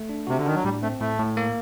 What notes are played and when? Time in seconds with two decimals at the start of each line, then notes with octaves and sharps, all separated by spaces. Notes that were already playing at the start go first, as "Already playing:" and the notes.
Already playing: A3
0.09 D4
0.27 C3 F#4
0.38 D3
0.46 D#3 D4
0.55 F#3
0.64 A2 G3
0.82 A3 C4
1.00 A2 A3
1.19 A2
1.37 A#3